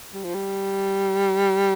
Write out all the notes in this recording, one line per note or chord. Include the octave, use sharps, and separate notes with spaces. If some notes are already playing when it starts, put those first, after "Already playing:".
G3
F3
G3